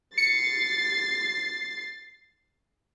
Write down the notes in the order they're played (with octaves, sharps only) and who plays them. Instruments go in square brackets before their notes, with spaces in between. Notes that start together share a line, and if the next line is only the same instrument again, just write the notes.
[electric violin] A6 C7 [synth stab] C#7